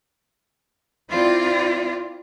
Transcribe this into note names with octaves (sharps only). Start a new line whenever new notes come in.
C4 E4 F4 D5